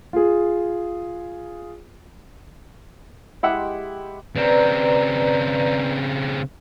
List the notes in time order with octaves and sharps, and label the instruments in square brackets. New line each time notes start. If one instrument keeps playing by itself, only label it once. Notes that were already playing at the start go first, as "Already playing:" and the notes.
[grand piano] F4 G#4
[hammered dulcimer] G#3 G4 [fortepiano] E4 E5 F#5
[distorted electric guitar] C#3 C4 [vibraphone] B4 D5 A#5